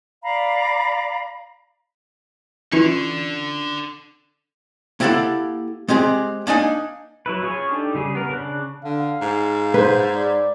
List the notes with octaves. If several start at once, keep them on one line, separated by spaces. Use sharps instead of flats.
D5 F5 A#5 B5
D3 E3 C#4 F4 C#6
A#3 E4 G4 A4 F5 F#5
G#3 C4 G4 G#4
A#3 D4 D#4 G#5
F#3 E4 B4
C#4 F4 G#4 C#5 G#5
D4 D#4 G4 A4
C#3 G3 G#4
B3 A#4
C#3 D4 F#6
D3 F5
G#2
B4 C5
D5